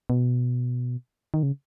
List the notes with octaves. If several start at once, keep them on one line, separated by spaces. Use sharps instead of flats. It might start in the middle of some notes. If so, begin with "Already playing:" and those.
B2
D#3
C#3